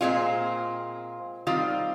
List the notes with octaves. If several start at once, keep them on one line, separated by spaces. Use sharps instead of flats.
A#2 G#3 C4 F4
D#3 G3 C4 F4